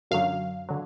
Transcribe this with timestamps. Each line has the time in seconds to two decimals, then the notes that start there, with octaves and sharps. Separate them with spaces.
0.11 F#2 D3 F#3 F5
0.69 D3 F#3